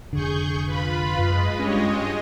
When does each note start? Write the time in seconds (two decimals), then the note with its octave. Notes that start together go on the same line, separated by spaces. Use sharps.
0.13 F1 D3 G#4 C#6 G6
0.66 F4 B4 B5
1.19 F#2 G#3 D#5
1.59 G2 C#4 G4 C#5